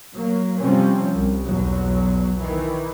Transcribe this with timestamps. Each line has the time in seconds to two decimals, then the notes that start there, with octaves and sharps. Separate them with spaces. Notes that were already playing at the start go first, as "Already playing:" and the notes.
0.15 F#3 A#3
0.60 C3 F3 G3 C4 C#4
1.13 C2
1.46 B1 E2 F#3
2.39 D#3 E3